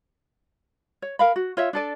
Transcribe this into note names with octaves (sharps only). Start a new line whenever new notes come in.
C#5
A#4 F5 B5
F#4
F4 C#5 E5
D4 A4 D5